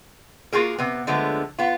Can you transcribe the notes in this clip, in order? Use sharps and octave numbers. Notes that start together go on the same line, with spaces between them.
A#3 F4 F#4 G#4 A#4
C3 B3
D3 F3 G#3 A3 B3
B3 F4